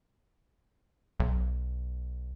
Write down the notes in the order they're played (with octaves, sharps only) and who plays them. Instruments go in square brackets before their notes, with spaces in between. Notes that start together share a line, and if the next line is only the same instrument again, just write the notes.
[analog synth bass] B1